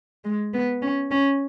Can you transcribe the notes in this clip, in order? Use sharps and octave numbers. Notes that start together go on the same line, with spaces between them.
G#3
B3
C#4
C#4